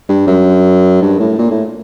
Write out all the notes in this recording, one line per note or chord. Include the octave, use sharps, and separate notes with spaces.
G2
F#2
G2
A2
A#2
A2